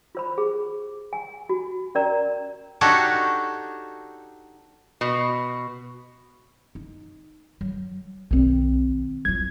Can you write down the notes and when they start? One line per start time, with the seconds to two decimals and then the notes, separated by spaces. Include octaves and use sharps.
0.15 F4 C5 B5
0.38 G#4
1.13 G#5
1.49 F#4
1.95 C#4 A#4 D5 A#5
2.81 D4 D#4 F#4 G4 A4 C#5
5.01 B2
6.75 D#4
7.61 F#3
8.31 B1 D#3 C4
9.25 F#3 F4 G#6